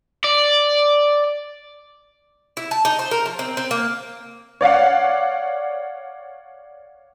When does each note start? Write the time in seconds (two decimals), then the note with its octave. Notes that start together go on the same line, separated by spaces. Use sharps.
0.24 D5
2.57 E4
2.71 A5
2.85 D#4
2.99 C5
3.11 A#4
3.26 F3
3.39 C4
3.57 C4
3.71 A#3
4.61 C#5 D5 F5 F#5